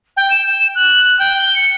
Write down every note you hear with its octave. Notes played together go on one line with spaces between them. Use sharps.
G5
E7
F#6
G5
G7
C#7